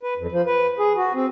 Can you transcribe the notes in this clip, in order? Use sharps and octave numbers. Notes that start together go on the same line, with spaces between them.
B4
F2
F3
B4
G#4
F#4
C4